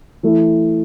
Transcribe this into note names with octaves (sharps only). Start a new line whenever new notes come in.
E3 A3 E4